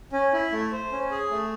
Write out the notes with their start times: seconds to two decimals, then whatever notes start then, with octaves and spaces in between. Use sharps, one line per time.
0.12 C#4
0.33 E4
0.52 A3
0.72 C5
0.92 C#4
1.11 G#4
1.31 A3